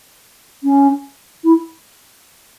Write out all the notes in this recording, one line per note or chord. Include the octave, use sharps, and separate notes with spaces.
C#4
E4